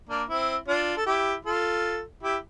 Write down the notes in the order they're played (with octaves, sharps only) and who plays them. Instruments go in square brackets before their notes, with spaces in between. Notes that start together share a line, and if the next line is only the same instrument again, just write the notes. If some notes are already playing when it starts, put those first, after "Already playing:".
[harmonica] A#3 D4
C4 E4
D4 F4
A4
E4 G4
F4 A4
E4 G4